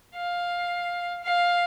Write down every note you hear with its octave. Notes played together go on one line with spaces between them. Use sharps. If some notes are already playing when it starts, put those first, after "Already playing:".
F5
F5